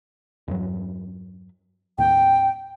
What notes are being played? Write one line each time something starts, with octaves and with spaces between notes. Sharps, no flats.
E2 G2 F#3
D#2 A2 G5